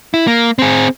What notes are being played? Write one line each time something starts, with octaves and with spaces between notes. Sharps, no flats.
E4
A#3
C4 G#4